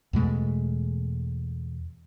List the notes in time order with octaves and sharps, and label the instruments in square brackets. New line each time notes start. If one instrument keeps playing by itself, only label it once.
[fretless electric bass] E2 B2 G#3 A3